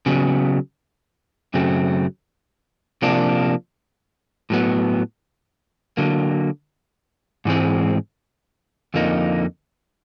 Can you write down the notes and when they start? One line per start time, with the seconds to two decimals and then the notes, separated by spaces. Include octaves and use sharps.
0.06 C#3 F#3 B3
1.54 F#2 C#3 F#3 A3 C4
3.02 C3 F3 A#3 D4
4.50 A2 F#3 B3
5.97 D3 F#3 A#3
7.45 G#2 E3 G#3 C4
8.94 F2 D3 F3 A#3 D#4